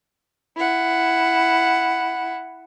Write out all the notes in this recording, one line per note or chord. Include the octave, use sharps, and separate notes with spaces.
E4 F#5